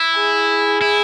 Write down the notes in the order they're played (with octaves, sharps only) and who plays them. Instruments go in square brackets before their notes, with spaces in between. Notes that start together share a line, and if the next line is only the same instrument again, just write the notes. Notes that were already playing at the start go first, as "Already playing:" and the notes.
Already playing: [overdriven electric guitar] E4
[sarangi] G#4
[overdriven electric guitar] E4